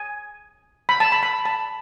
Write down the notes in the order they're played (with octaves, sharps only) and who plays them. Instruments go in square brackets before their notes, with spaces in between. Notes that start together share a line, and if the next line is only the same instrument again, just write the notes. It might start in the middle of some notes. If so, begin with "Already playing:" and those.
Already playing: [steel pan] G#5
B5
A5
B5
B5
A5